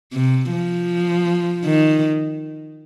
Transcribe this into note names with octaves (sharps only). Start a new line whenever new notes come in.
C3
F3
D#3